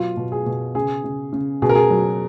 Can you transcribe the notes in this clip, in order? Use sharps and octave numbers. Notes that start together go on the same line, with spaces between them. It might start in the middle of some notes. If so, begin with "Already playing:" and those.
Already playing: B2 F#3 F4
B2
G#4
B2
C#3 G#4
C#3
C#3
B2 G#4
A#4
G#4
F#3